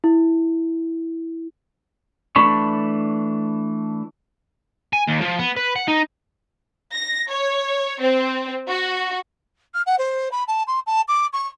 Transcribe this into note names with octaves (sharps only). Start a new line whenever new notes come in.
E4
E3 A3 D4 B5 C#6
G#5
D#2
F3
B3
B4
F#5
D#4
A#6
C#5
C4
F#4
F6
F#5
C5
B5
A5
C6
A5
D6
C#6